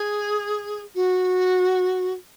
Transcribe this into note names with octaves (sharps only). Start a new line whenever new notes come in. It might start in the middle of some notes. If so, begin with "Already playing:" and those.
Already playing: G#4
F#4